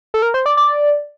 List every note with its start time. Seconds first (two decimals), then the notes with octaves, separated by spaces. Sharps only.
0.14 A4
0.22 A#4
0.34 C5
0.46 D5
0.57 D5